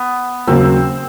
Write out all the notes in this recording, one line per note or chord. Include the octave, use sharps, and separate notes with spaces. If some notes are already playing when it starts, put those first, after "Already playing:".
Already playing: B3
D#2 C#3 F#3 A#3 C4